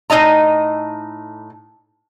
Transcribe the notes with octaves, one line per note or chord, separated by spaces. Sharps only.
A2 A3 D#4 D#5 A#5